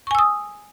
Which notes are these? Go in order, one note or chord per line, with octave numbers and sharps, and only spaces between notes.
G#5 C#6 D#6 E6